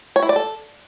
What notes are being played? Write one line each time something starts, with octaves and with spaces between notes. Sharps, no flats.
C#5
E4
D5
A4